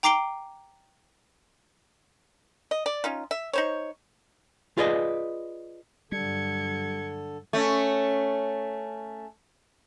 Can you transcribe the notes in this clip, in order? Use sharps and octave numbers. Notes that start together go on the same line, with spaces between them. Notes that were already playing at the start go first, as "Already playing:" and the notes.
G5 A#5 D6 C7 D7 G7
D#5
D5
C#4 D#4 F4
E5
D#4 C5 C#5
F4 G#4 B4 D5 D#5
G2 D3 F#3 G3 A4 G#6 C#7
A3 C#4